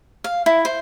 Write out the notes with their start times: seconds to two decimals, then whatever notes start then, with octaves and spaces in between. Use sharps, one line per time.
0.24 F5
0.46 E4
0.65 C5